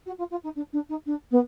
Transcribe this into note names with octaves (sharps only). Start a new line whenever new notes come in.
F#4
F4
F4
D#4
D4
D4
D#4
D4
B3